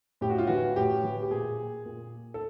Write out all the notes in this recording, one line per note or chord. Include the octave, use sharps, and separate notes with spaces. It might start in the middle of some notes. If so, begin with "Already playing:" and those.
A2 G4
F#4
F4
E3 F#4
A2 G4
E3
G4
A#2 G#4
A#2
A4